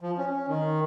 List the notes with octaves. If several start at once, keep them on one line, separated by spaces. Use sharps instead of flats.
F3
C#4
C#4
D#3